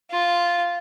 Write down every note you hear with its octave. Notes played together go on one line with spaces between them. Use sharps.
F4